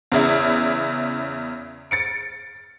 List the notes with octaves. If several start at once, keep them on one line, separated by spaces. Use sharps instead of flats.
E2 C#3 E4
A6 C#7 D7